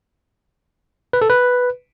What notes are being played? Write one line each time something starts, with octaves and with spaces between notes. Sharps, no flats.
B4
A4
B4